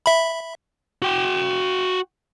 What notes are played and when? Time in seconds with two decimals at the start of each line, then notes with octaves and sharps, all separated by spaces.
0.06 E5 B5
1.02 F#4 G5